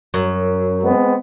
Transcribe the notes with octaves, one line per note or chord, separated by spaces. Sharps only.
F#2
G#3 B3 C4